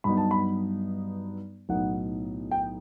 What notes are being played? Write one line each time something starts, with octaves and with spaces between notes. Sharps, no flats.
G2 F#3 B3 D#4 B5
A5
B5
B1 A2 F#3 B3 D#4 F#5
G5